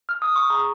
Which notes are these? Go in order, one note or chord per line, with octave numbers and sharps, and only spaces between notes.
F6
D#6
C#6
G#4 A#5